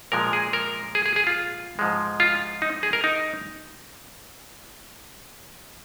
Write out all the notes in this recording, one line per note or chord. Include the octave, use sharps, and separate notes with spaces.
A#2 F3 G#3 A#4
G#4
A#4
G#4
G#4
G#4
F4
G#2 F3 G#3
F4
D#4
G#4
A#4
D#4